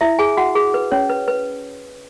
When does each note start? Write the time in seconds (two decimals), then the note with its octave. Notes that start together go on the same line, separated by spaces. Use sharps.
0.01 E4 E5
0.19 G#4 G#5
0.37 F#4 F#5
0.55 G#4
0.74 B4
0.92 C#4 C#5
1.09 B4
1.28 B4